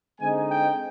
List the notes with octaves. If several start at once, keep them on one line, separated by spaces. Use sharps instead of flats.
D3 G#3 C4 D#4 G#5
G5